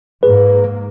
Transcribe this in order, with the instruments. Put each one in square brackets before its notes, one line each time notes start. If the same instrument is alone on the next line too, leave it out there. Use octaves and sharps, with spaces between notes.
[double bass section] G#2 A#3 [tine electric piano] G#4 B4